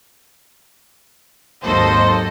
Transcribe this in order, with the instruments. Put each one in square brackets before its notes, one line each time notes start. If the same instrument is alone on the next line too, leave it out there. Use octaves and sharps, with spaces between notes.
[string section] G#1 D#2 F#3 A4 C5 D#5